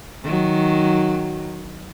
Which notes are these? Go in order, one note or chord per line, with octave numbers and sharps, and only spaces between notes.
D#3 F#3